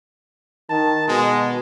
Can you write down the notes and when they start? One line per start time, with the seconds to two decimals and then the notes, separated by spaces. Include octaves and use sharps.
0.70 D#3 A5
1.08 B2 G#3